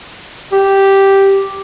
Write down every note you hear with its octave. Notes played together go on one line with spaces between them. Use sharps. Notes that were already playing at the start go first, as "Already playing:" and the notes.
G4